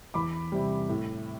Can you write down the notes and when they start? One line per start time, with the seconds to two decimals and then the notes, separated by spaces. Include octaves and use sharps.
0.14 E2 B5 D6
0.52 C3 G3
0.89 A2